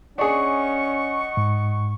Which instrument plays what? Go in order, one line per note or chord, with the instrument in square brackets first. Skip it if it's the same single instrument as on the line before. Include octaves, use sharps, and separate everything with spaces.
[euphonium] C#4 [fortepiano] D4 G#4 [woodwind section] D#5 F#5 C#6
[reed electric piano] G#2